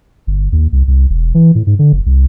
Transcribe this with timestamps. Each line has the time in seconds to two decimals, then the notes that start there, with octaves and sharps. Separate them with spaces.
0.27 G1
0.52 D#2
0.72 C2
0.88 C2
1.10 E1
1.34 E3
1.55 A2
1.67 G#2
1.79 D3
1.93 F#1
2.06 C2